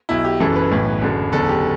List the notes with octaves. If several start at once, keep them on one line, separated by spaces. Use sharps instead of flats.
B1 B2 E4
G4
F#1 F#2 E3 A4
B4
B1 A2 E3
F#1 F#2 D3
F#1 E2 D3 A4
G4